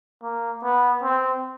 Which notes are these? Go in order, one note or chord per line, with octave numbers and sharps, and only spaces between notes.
A#3
B3
C4